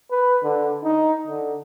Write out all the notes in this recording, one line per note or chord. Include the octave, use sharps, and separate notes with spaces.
B4
D3
D#4
D3